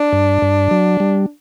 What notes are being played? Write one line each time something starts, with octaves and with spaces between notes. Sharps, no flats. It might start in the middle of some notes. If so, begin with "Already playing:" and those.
Already playing: D4
G2
G2
F#3
G3